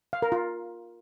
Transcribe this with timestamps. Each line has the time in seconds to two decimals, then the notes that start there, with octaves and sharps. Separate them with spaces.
0.13 F5
0.22 A#4
0.32 F4